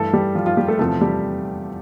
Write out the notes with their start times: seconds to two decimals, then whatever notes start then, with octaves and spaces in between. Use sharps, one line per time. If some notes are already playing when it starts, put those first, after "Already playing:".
Already playing: G2 E3 A3 A4
0.13 G3 G4
0.35 F3 F4
0.46 F3 F4
0.57 G3 G4
0.68 A3 A4
0.79 E2 C3 F3 A3 A4
1.01 G3 G4